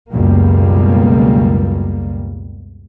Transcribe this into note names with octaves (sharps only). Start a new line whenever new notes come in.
C#2 F#2 B2 G3 A#3